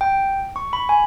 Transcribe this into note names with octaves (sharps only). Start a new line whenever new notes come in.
G5
C#6
B5
G#5